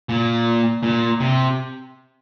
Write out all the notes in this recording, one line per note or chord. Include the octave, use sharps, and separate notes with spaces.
A#2
A#2
C3